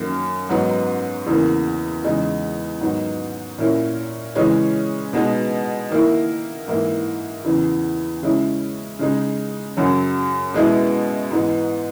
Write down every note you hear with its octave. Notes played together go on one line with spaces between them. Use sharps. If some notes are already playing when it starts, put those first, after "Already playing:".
Already playing: F#2 D#3 A#3
G#2 F#3 B3 D#4
E2 C#3 E3 A#3
E2 C#3 G#3 D#4
G#2 D#3 F#3 B3 D#4
A#2 A#3 C#4 E4
C#3 E3 G#3 C#4
B2 G#3 B3 D#4
D#3 A#3 E4
G#2 E3 A#3 E4
E2 C#3 E3
C#3 G#3 C#4 E4
C#3 G#3 D#4
F#2 C#3 F#3
B2 G#3 B3 E4
G#2 E3 B3 D#4